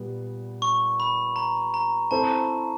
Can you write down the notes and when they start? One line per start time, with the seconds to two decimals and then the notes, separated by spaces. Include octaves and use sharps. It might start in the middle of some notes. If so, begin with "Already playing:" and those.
Already playing: A#2 G3 B3
0.62 C#6
1.00 B5
1.36 A#5
1.74 A#5
2.11 C4 E4 A4 C5 A5